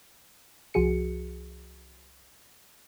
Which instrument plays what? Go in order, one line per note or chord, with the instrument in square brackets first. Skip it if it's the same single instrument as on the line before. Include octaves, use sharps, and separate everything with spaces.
[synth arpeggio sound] C2 F3 F#4 G#4 C#7